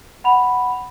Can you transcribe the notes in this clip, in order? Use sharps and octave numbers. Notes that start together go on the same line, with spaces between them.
F#5 B5 F7